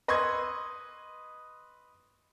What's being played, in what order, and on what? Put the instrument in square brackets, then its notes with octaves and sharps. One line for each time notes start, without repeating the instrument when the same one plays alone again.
[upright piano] B4 D#5 C6 C#6 E6 G#6